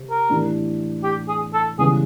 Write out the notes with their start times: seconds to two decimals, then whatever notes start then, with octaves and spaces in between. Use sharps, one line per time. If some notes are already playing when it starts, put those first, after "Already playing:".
Already playing: C3
0.10 A#4
0.29 A2 E3 A3 D4 G4
1.04 G4
1.28 G#4
1.54 A4
1.78 C#2 C#3 E3 G3 B3 G#4